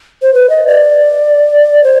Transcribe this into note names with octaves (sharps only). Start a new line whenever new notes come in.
C5
B4
D#5
D5
C5